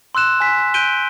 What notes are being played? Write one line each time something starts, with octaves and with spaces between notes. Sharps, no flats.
C6 E6 F#6 E7
G#5 B6
F#6 G6 D7 D#7 G7